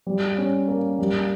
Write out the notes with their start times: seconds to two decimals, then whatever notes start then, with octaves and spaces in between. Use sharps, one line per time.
0.07 G3
0.38 C#4
0.68 A#3
0.99 G3